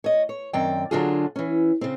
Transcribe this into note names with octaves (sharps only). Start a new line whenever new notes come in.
C#5 D#5
C#5
F#2 D#3 C4 D5 G5
D3 F#3 D4 F4 F#4 G#4
E3 C#4
C#3 C4